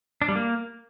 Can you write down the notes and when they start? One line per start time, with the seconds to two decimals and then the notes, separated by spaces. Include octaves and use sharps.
0.22 D4
0.28 G3
0.35 A#3